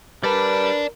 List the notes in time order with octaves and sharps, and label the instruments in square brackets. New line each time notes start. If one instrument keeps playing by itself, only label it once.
[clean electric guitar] G3 [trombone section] A#4 [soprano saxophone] B4 [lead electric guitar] D5 A5